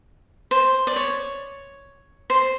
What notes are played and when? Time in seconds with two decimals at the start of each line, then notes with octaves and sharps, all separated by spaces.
0.51 C5
0.87 D5
0.96 C#5
2.30 C5